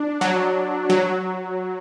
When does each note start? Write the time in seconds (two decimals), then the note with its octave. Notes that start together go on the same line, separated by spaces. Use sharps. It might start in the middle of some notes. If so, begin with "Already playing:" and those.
Already playing: D4
0.21 F#3
0.90 F#3